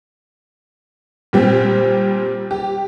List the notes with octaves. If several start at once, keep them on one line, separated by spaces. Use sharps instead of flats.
A#2 G3 C4
G4